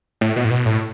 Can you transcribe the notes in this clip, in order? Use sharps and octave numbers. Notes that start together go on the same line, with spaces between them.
A2
B2
A2
B2
A2